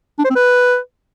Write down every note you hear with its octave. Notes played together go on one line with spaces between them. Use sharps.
D4
C5
C4
B4